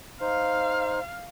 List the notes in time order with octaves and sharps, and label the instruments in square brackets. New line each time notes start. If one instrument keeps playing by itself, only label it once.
[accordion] D#4 C5 [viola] F5